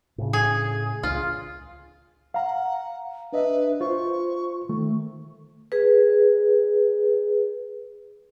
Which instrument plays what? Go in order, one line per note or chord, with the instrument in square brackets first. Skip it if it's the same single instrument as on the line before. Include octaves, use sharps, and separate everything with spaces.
[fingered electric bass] A2 C#3
[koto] G#4
[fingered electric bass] C#2 [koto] F4
[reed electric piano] F5 A#5 [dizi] F#5
[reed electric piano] D4 D#5 E5 [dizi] B4
[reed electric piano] F4 C5 [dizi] C#6
[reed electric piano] D#3 A3
[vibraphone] G#4 B4